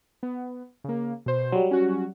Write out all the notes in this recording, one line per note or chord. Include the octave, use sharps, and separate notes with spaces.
B3
C#3 A#3
B2 C5
F#3 G3
C#4 F#4